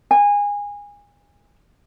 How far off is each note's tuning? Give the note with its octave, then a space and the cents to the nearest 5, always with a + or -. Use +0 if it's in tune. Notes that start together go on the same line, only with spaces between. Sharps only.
G#5 -25